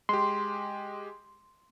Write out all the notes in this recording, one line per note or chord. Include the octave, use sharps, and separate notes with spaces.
G#3 G4 C6